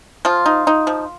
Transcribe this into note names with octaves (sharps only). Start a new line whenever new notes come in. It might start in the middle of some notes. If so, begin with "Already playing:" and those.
F3 F4
D#4
D#4
F3